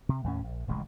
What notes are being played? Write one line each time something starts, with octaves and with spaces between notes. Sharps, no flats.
C3
D#2 A2 C#4
A#1
D#1 A1 C#3 G#3